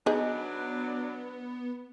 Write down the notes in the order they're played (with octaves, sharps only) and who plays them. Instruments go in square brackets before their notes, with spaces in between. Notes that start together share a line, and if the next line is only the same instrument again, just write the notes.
[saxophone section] F#3 D4 [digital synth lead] B3 [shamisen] D#4 G#4 B4